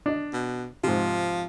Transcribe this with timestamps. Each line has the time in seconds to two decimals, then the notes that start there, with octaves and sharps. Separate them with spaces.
0.06 D4 D#5
0.33 B2
0.84 G#2 C3 F3